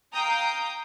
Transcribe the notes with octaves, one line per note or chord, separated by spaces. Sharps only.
F5 G5 A#5 D#6 G6